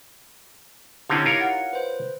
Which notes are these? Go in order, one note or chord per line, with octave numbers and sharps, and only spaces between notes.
D3 C4 C#4 D#4 E4 G4
F4 A#4 C#5
F#5
B4 C5